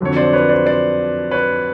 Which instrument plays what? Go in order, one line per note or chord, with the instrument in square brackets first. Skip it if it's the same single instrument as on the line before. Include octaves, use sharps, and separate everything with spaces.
[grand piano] F2 D3 F#3 C#5
C5 D5
B4 C#5
C5 D5
C5 D5
B4 C#5